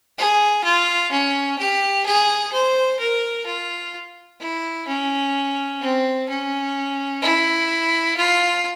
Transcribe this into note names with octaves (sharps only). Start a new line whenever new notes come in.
G#4
F4
C#4
G4
G#4
C5
A#4
F4
E4
C#4
C4
C#4
E4
F4